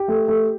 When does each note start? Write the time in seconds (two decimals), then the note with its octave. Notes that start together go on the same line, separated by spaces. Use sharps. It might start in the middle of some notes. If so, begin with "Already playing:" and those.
Already playing: G4
0.08 A3
0.28 A3